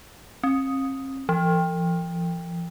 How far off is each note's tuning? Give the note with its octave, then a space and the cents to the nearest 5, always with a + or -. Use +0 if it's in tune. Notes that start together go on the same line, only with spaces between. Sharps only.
C4 +45
F3 -40